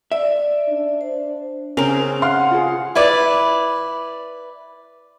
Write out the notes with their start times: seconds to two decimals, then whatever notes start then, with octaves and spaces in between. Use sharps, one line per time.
0.12 D5 E5
0.69 D4
1.01 C5
1.77 C#3 C4 C#4 A#4 F7
2.22 F5 F#5 C6 F6
2.51 F4 G#4
2.95 E4 B4 D5